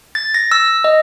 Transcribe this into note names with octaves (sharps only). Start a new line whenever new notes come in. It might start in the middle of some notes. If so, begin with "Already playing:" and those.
A6
A#6
E6
D#5